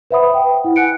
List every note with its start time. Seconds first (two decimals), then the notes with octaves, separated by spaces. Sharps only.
0.11 B4 C5 E5 F#5 B5 D#6
0.34 G5
0.64 E4 F#5
0.76 F#5 G#5 F#6 C#7 D7